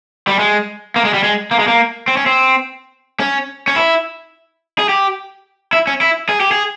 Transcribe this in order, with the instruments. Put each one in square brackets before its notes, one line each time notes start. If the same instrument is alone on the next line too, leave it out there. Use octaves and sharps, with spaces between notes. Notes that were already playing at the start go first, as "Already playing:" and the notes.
[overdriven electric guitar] G3
G#3
A#3
G#3
G3
G#3
A#3
G#3
A#3
C4
C#4
C4
C#4
C#4
E4
G#4
G4
E4
C#4
E4
G#4
G4
G#4